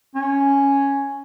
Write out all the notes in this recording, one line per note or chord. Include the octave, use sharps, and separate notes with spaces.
C#4